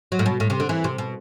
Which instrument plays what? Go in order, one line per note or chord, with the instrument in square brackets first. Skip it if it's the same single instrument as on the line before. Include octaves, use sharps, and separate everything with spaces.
[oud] F#3
A2
B2
A2
C3
D3
E3
C3
B2